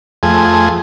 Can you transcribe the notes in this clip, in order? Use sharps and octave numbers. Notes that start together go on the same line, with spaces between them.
F2 A3 G#4